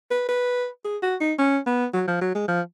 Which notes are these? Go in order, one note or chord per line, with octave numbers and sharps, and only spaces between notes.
B4
B4
G#4
F#4
D#4
C#4
B3
F#3
F3
F#3
G#3
F3